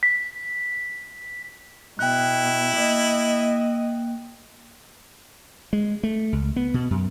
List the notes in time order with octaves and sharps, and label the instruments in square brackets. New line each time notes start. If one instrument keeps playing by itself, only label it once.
[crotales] B6
[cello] B2 [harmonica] E4 [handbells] G5 F#6
[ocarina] A#3 [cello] D#5
[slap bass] G#3
A3
C#2
B3
B2
F#2